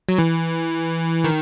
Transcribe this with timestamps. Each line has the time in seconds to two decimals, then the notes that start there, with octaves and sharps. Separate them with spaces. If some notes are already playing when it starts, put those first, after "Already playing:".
0.09 F#3
0.18 E3
1.24 D#3